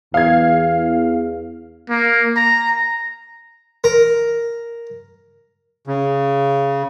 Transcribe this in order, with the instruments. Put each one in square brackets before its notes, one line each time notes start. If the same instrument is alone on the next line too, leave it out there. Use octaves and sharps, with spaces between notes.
[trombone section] E2 [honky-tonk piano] F5 G#6
[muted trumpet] A#3
A#5
[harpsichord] A#4
[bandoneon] C#3